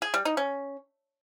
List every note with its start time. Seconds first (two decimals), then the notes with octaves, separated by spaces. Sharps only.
0.02 G#4
0.14 G3
0.25 D#4
0.37 C#4